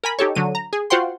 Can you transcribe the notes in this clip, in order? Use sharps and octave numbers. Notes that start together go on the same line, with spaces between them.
A#4 G#5 B5
D#4 G4 A4 C#5
D3 F#3 D#7
A#5
G#4
F4 F#4 C5 F#5 G5 C6